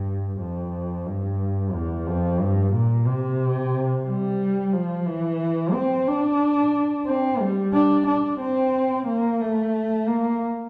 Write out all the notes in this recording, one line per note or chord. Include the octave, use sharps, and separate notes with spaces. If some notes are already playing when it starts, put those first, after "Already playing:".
Already playing: G2
F2
G2
E2
F2
G2
A#2
C3
G3
F3
E3
C4
D4
C4
G3
D4
D4
C4
A#3
A3
A#3